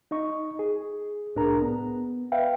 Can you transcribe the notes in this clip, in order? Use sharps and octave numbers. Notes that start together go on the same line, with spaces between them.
D#4 D#5 C#6
G#4
C2 A2 D4 G#4 A#4 A#5
B3
B4 E5 F5 G5